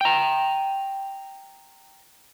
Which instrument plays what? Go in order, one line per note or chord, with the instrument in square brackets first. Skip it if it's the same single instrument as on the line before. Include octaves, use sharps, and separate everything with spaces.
[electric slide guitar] G5 A#5